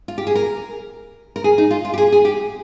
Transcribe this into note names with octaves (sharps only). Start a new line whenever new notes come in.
F4
G4
G#4
A#4
A#4
G#4
D#4
F4
F4
G4
G#4
G#4
G4